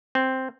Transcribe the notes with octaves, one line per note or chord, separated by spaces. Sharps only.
C4